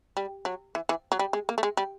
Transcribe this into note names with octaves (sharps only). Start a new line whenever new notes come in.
G3
F#3
E3
E3
F#3
G3
G#3
A#3
A3
G#3
G3